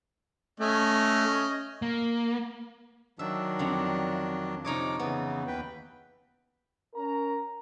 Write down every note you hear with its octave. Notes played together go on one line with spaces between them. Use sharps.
A3 C#4 D#5
A#3
D#3 F#3 D4 E5
F2 D3
C3 F3 D#4 C#5 D#5 D6
C#3 E3 B3
D#2 B4 G5
C#4 A#4 A#5